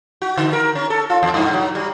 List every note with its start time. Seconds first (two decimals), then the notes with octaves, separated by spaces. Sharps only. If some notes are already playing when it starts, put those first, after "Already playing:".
0.22 F#4
0.38 D3
0.53 A#4
0.75 C#4
0.90 A4
1.10 F4
1.23 E2
1.34 G2
1.54 F#3
1.75 G3